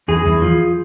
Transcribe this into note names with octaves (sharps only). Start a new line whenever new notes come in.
E2 G#4
E2
F3